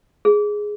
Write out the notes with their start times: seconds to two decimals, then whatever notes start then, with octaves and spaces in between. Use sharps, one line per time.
0.25 G#4